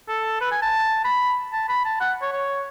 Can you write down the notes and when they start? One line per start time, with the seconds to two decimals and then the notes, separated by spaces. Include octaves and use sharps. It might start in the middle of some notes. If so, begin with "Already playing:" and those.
0.09 A4
0.41 B4
0.52 G#5
0.62 A5
1.05 B5
1.53 A5
1.69 B5
1.85 A5
2.01 F#5
2.22 C#5
2.33 C#5